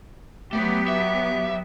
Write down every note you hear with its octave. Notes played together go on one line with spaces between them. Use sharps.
F#3 A3 B3 G4
E5